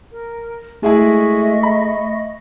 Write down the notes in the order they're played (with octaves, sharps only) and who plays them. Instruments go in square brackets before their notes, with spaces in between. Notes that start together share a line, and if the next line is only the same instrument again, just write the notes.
[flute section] A#4
[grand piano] G#3 E4 G#4 [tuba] A3 [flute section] D#5 E5 C#6
[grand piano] B5